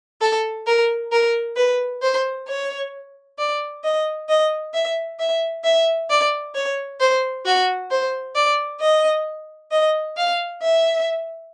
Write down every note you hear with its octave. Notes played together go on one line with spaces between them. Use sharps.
A4
A#4
A#4
B4
C5
C#5
D5
D#5
D#5
E5
E5
E5
D5
C#5
C5
F#4
C5
D5
D#5
D#5
F5
E5